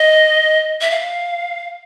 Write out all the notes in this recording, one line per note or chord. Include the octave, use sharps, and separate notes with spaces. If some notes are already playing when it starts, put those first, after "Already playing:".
Already playing: D#5
E5
F5